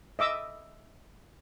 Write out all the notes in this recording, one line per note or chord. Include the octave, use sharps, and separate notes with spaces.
D#5 E5 D6 E6